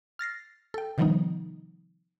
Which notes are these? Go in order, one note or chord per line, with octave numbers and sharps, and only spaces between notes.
F6 A6 A#6 C7
A4 G5
C3 D#3 F3 G3 B3 D#4